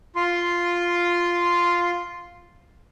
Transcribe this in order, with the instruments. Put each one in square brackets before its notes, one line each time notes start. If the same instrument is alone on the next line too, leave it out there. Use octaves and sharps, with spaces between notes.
[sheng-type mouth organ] F4 C6